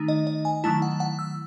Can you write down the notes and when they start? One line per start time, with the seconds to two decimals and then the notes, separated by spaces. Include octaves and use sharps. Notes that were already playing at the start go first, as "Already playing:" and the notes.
Already playing: D#3 A3 D#4
0.08 D#5
0.27 D#5
0.45 G#5
0.64 D#3 F#3 A3 E4 A5
0.82 F#5
1.00 F#5
1.19 E6